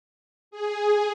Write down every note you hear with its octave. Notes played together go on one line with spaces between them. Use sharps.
G#4